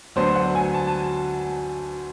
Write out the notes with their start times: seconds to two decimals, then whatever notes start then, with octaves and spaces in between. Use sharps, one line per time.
0.16 D2 D3 F#3 B3 D4 C5
0.35 F#5
0.55 G#5
0.74 A5
0.87 A5